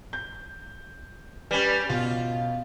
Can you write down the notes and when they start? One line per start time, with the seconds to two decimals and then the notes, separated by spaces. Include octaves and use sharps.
0.13 G6
1.51 G3 C#4 B4
1.89 B2 F4